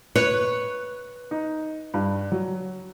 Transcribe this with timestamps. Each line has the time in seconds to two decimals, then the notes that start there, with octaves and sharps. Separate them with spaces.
0.16 B4 C#5 F#6
1.31 D#4
1.94 G2
2.32 F#3